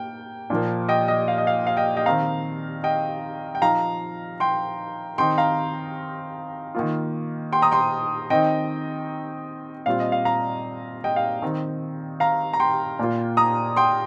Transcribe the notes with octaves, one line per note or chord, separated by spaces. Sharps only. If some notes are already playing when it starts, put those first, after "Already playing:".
Already playing: A#3 G5
A#2 F3 A#3
D#5 G5
D#5
F5
D#5
F5
F5
D#5 G5
D#5 G5
D#3 C4 D#4 F5 A#5
D#5 G5
G5
F3 D#4 F5 A#5
G5 C6
D#3 C4 D#4 G5 C6
F5 A#5
D#3 A#3 F4
G5 C6
A#5 D#6
G5 C6
D#3 C4 D#4 D#5 G5
A#2 G3 C4 F4 F5
D#5
F5
F5 A#5
D#5 G5
F5
D#3 C4 D#4
F5 A#5
A#5
G5 C6
A#2 A#3 F4
A#5 D#6
G5 C6